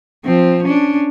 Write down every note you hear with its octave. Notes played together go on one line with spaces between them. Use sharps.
F3 C4
C#4 D4